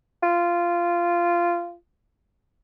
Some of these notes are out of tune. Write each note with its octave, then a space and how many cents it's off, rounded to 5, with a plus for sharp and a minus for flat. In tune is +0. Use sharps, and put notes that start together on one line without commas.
F4 -15